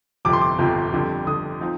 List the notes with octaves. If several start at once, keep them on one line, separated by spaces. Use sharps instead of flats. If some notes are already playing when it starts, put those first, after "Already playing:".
G1 F2 C3 F3 D6
C6
D6
G1 F2 C3 F3
F2 D3 G3
F2 D3 G3 D#6
F3 C4 D#4